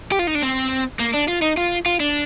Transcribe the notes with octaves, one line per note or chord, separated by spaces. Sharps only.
G4
F4
D#4
D4
C4
A#3
D4
F4
D#4
F4
F4
D4